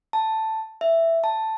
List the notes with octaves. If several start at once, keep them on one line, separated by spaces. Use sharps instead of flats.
A5
E5
A5